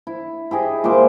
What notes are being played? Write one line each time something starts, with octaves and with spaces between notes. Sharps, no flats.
E4
E4 G4 G#4 D#5
A#2 G#3 C5 D6